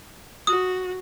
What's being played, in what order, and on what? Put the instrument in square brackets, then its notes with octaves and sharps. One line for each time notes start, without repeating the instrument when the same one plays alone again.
[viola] F#4 [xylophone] D#6